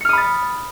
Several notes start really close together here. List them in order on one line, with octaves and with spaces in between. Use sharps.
C#7 F6 D#6 B5 A6